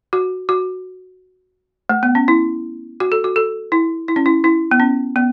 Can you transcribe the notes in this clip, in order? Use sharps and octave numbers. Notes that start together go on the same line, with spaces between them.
F#4
F#4
A3
B3
C#4
E4
F#4
A4
F#4
A4
E4
E4
C#4
E4
E4
B3
C#4
B3